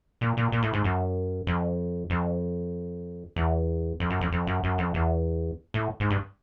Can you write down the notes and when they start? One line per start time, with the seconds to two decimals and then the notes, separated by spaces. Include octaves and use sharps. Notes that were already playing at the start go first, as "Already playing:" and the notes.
0.21 A#2
0.37 A#2
0.52 A#2
0.63 A2
0.74 G#2
0.84 F#2
1.47 F2
2.10 F2
3.36 E2
4.00 F2
4.10 F#2
4.21 F2
4.32 F2
4.47 F#2
4.64 F#2
4.78 F2
4.94 E2
5.74 A2
6.00 G#2
6.10 G2